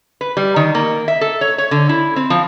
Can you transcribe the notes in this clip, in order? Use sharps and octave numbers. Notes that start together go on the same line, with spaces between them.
B4
G3
D#3
A#3
E5
A4
C#5
C#5
D3
E4
C4
F3